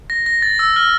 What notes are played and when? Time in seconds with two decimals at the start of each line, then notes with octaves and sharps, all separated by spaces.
0.10 A#6
0.26 A#6
0.42 A6
0.59 E6
0.76 F6